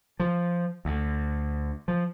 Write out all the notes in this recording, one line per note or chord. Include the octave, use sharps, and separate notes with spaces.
F3
D2
F3